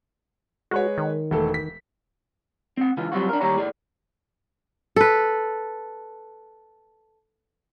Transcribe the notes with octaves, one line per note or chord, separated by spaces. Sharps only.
G#3 F#4 B4 C#5
D#3
E1 A3 A4
B6
C4 F#5
C#2 C#3 E3 F4
F#3 G3 C4 F4 F#4
D4 A#4
D#2 G3 G4 C#5 A#5
A2 G#4 D5
A4 B4